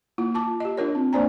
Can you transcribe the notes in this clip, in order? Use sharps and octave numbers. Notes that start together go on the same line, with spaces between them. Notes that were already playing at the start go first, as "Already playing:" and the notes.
A#3 E4 F4
F4 A5 D6
G4 D#5
D4 F4 A#4 C#5
C4
A#3 D4 C5 D5 G#5 A#5